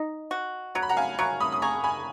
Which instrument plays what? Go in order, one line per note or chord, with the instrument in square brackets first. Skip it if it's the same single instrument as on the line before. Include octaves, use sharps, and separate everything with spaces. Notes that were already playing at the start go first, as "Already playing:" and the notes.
Already playing: [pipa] D#4
F#4
[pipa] F#3 [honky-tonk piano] A#5
[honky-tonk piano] B5
F#5 A#5
F5 G#5
[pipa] F#3 [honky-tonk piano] A#5 C#6
[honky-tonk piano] B5 D#6
D#6
[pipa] G#4 [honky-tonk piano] A#5 C#6
[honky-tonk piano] G#5 B5